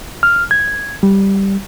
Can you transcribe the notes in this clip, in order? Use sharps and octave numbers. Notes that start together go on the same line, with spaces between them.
F6
G#6
G3